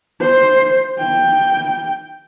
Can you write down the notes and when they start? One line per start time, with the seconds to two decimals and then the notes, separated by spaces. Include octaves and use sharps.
0.20 C5
0.98 G5